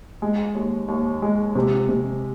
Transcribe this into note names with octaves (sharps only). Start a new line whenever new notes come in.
G#3
D#2
D#2
G#3
C3
C3